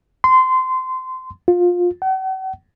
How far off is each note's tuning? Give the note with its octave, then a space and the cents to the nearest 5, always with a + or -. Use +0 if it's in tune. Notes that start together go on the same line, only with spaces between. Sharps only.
C6 -20
F4 +20
F#5 +45